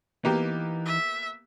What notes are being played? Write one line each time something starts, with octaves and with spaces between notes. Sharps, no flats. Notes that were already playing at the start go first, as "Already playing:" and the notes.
E3 A#3 B3 D#4 G4
E5